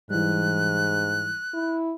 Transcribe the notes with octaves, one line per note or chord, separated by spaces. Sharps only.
G#2 E3 G3 F#6
E4